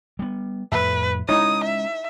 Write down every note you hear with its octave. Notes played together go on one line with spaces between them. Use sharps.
G3 B3
F2 A2 B4 E5
G#3 C#4 D#4 E4 C#5 D#6
E5